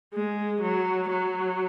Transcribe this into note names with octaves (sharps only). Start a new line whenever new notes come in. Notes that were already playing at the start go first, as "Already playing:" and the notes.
G#3
F#3
F#3